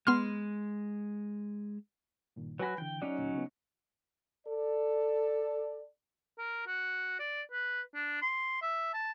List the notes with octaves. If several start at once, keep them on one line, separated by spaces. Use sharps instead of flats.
G#3 B3 C6 F6
G2 A#2 D#3
F#3 F#4 B4 G#5 B5
D3 E3 G5
F#3 C#4 D#4 D5
D2 A#2
C#3 B3
A4 D5
A#4
F#4
D5
B4
D4
C6
E5
A5